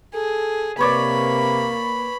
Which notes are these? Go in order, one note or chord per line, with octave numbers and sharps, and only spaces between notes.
G#4 A4
C3 A#3 B4 C#5 D5 B5